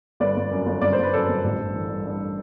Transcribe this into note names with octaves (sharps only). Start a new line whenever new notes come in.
G1 B4 D5
G1
F#2
G1
G1 D5
C5
G1
B4
F#2 A4 C5
G1
A1
G2
E3
G2
G2